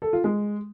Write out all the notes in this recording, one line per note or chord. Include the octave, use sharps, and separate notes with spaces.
A4
F4
G#3